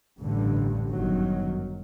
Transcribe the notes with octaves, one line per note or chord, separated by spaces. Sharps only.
A1 G2 D3
G1 F#2 D#3 F#3